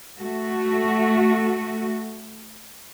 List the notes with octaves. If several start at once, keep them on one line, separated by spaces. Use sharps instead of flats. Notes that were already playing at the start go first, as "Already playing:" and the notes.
A3 F#4